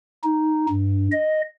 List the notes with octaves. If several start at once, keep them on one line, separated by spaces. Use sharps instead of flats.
D#4
G2
D#5